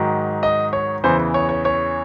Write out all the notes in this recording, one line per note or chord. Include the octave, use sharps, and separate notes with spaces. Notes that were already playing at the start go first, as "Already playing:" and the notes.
Already playing: G#2 D#3 F#3
D#5
C#5
E2 C#3 E3 C5
C#5
C#5
C#5